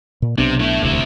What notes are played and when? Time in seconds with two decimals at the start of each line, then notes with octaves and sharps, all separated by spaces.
0.22 A#2
0.38 B1 C3 B3 D4
0.60 A3 E4
0.83 E1 D2 C3 E4